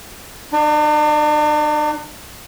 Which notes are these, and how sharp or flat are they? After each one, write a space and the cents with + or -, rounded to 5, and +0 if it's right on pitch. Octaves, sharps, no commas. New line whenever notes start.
D4 +45 D5 -15